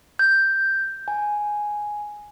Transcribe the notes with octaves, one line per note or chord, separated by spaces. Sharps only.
G6
G#5